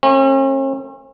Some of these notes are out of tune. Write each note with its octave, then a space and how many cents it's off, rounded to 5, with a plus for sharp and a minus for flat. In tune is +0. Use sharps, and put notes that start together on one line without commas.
A3 +30 C#4 -45